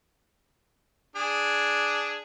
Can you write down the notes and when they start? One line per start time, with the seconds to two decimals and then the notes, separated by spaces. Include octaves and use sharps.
1.16 D4 G#4